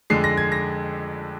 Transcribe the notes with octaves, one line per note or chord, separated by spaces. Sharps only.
F2 D3 G#3 C7
A#6
G#6
A#6